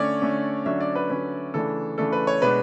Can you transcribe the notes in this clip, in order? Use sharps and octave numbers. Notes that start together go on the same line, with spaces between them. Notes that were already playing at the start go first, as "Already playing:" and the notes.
Already playing: D3 A3 C#4 C#5 D5
D3 A3 C#4
D3 F#3 C#4 E5
D5
B4
D3 F#3 C#4 B4
C#3 E3 A3 D4 A4
C#3 E3 A3 D4 A4
B4
C#5
B2 G#3 B3 D4 B4